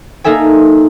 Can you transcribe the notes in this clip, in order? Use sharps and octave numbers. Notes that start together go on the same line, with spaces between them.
A#3 D#4 A4 E5 G#5